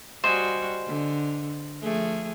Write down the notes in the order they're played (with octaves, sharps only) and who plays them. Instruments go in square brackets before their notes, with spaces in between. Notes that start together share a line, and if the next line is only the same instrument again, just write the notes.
[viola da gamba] G3 F#4 [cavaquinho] C5 D#5 G#5
[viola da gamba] D3
F3 A3 G#4